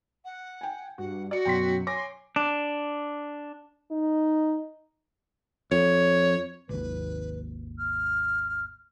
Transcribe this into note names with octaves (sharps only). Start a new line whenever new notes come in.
F#5
G5 G#5
G2 F#4 F#5
F#4 D5 C#7
F#2 B2 F#3 G5 C6 B6
C#5 G#5 C6 D6 A#6
D4
D#4
F2 C#5
G#1 D#2 B4
F6